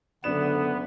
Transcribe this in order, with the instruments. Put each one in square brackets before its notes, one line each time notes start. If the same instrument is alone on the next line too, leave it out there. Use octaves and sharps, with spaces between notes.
[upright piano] F#1 D4 E7 [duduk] D3 [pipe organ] B3